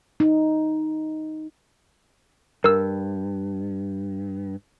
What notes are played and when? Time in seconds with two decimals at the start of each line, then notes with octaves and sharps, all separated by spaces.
0.20 D#4
2.64 G2 A#4 E6